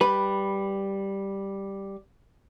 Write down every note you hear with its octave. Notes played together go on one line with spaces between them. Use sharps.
G3 B4